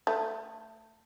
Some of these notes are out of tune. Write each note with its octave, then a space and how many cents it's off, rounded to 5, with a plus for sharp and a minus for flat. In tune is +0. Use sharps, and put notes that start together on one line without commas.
A3 +20